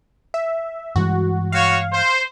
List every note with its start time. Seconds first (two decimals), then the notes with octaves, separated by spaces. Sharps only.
0.34 E5
0.96 G2 E3 G#3 F#4
1.52 F#4 C#5 F5
1.91 C5